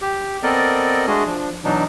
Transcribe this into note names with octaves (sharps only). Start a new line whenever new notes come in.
G4
B3 C4 A4 A#4 D5 D#5
G#3 A3 D4 F#4 G#4 D#5
F3 D4
B2 E3 F#3 D4 D#4